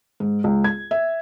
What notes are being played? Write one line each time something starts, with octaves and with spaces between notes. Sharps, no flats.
G#2
C#2
G#6
E5